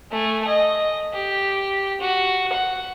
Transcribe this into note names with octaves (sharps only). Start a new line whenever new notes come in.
A3 G#5
D#5
G4
F#4
F#5